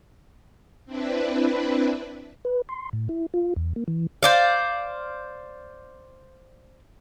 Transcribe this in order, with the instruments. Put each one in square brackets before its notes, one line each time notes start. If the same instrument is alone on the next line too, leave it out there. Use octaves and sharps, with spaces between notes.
[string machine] C4 D4 E4 B4
[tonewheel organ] B4
C6
A2
E4
F4
E2
A#3
E3
[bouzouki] C5 D5 F5